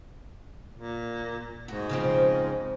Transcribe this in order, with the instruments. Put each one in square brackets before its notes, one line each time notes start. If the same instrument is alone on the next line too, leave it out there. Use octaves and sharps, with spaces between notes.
[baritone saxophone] A#2
[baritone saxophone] G#2 [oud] F#4
[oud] C#3 F3 C4